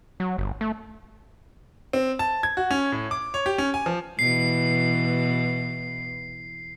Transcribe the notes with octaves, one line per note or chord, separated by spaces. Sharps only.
F#3
G1
A3
C4
A5
G#6
F#4
C#4
A2
D6
C#5
G4
C#4
G#5
F3
B2 E3 C7